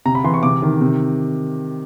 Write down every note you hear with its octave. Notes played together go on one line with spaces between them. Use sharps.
C3 A#5
B5
E3 C6
C#6
C3 D6
D#3
C3